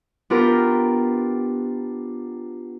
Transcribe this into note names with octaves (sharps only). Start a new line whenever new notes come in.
B3 D4 F4 G4 A#4